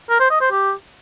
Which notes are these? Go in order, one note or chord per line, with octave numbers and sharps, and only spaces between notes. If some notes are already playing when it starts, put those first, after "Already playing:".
A#4
C5
D#5
C5
G4